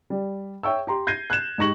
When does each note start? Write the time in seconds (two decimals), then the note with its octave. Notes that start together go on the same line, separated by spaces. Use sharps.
0.10 G3
0.63 C#5 E5 G5 C#6 E6
0.87 G4 A#5 C6
1.07 G6 G#6 A#6 C7 D#7
1.30 F#6 G#6 E7
1.58 G#2 D#4 G4 C#6 A#6 F#7